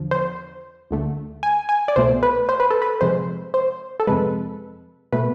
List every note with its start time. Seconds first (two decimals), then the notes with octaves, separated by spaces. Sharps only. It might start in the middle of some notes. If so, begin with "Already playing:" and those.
Already playing: E2 D3 F3
0.11 C5
0.91 D2 D3 A3
1.43 G#5
1.69 G#5
1.88 D5
1.96 C2 B2 A3 C5
2.23 B4
2.49 C5
2.60 B4
2.70 A4
2.82 B4
3.01 F2 C3 G#3 C5
3.54 C5
4.00 A4
4.07 F2 C3 G#3 B4
5.13 B2 A3 B4